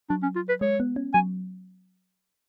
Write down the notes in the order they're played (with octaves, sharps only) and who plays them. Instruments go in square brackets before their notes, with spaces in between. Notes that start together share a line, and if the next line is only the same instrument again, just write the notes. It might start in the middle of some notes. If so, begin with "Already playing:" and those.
[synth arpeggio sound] F#3 [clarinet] D4
[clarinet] C#4
F4
B4
[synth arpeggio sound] G#3 [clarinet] C#5
[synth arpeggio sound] B3
C#4
[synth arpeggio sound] F#3 [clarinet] G#5